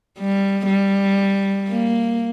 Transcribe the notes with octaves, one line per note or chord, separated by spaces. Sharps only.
G3
G3
A#3